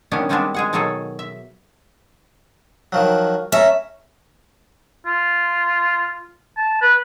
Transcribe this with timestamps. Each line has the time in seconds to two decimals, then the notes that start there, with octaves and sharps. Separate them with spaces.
0.11 D#3 G3 B3 C#4 D4
0.29 D#3 G3 G#3 B3 C4 D4
0.54 G#3 G#4 F#5
0.73 B2 D#3 F#3 G#4 A4
1.19 E5
2.92 D#3 F3 F#3
3.52 C#4 A4 E5 A#5
5.06 F4
6.57 A5
6.82 B4